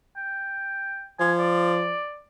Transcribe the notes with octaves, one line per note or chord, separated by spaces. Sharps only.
G5
F3 G#5
D5